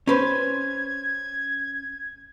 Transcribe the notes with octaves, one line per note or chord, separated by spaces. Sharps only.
C#4 B4 C5 G#6